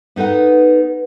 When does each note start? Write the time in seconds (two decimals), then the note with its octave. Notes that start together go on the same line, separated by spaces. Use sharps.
0.16 B3 D#4 A4 B4 F#5